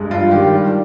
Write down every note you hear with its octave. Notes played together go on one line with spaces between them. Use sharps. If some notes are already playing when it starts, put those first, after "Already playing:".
Already playing: G2 G#3
G2 F4
D#3 G4
G3